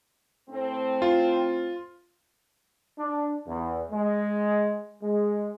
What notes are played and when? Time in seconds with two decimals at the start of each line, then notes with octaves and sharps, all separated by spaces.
0.50 A2 A3 C4
1.02 F4
2.98 D4
3.46 E2
3.91 G#3
5.02 G#3